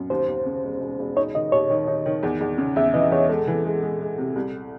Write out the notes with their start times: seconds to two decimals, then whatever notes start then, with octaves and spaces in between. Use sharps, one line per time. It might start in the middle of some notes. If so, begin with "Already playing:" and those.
Already playing: F#2
0.10 D#2 C5
0.28 D#2
0.46 C#3
0.64 E1
0.81 E1
0.99 E1
1.16 D#4 C#5
1.35 D#3 D#5
1.52 D#2 C#5
1.70 D#3
1.87 D#4
2.06 D#3
2.23 E2
2.41 E2
2.58 C#3
2.76 E2 E5
2.94 E3 D#5
3.12 E2 C#5
3.29 G#3 A4
3.47 E3
3.65 G#3
3.83 G#3
4.01 G#3
4.18 C3
4.36 C2